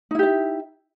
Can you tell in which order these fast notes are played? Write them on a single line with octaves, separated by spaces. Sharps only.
D#4 E4 G4 E5